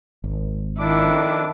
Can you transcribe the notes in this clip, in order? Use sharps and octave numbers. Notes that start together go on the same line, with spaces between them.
G#1
F2 D#3 D4 E4 D6